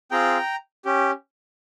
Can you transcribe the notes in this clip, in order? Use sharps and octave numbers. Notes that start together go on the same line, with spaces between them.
C4 F4 G#4 G5 A#5
C#4 G4